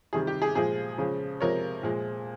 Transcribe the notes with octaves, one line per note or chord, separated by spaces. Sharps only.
C3 D#3 G3 G#4
G4
G#4
A#2 F3 G#3 G#4
C#3 F3 G#3
C3 F3 G#3 A#4 C#5
A#2 F3 G#3